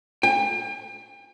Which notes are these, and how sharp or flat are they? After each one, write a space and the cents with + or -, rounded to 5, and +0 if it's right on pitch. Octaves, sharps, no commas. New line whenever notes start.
G5 +40